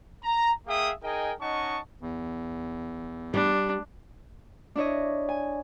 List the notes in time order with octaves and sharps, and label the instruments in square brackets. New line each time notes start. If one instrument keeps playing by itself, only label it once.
[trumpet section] A#5
A#3 G#4 E5 F5 G5 D#6
D#4 G#4 A#4 D#5 G5 G#5
C#4 D#4 D#5 F#5 A5 C#6
[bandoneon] E2
[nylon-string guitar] G3 [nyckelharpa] D4
[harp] D4 E4 C#5 D#5
G#5